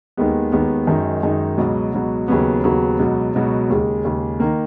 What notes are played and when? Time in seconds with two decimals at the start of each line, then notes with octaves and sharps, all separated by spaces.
0.17 D#2 D#3 G#3 B3
0.52 D#2 D#3 G#3 B3
0.87 F#2 D#3 G#3 D#4
1.23 F#2 D#3 G#3 D#4
1.58 C#2 B2 F#3
1.93 C#2 B2 F#3
2.28 D#2 C#3 F#3 B3
2.64 D#2 C#3 F#3 B3
2.99 C#2 B2 F#3
3.35 C#2 B2 F#3
3.70 D#2 C#3 G#3
4.05 D#2 C#3 G#3
4.40 D#3 A#3